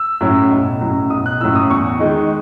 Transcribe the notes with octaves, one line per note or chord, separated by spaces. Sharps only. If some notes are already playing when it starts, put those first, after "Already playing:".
Already playing: E6
A2 F#3 C#4 E4
B1
A2 F#3 C#4 E4
B1 D#6
F#6
A2 F#3 C#4 E4 E6
D#6
E2 C#6
D#3 G#3 D#4